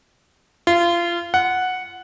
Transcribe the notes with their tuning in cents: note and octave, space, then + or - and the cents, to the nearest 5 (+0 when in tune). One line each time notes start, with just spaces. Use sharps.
F4 -25
F#5 -5